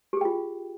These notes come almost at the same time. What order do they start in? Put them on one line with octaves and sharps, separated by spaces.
G4 G#4 G5 F4